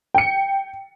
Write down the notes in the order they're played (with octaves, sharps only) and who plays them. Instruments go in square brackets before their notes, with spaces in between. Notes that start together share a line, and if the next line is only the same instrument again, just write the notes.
[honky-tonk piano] G5 C#7